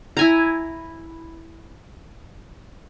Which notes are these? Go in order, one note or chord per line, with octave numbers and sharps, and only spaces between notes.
E4 G#5 A#5